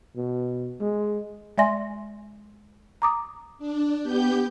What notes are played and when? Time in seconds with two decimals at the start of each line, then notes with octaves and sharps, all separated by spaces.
0.16 B2
0.80 G#3
1.58 G#3 D5 E5 G#5 C6 A#6
3.02 A#5 D6 D#6
3.58 D4
4.03 B3 G4 G6